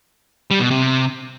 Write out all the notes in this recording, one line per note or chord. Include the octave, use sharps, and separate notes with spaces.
G3
B2
C3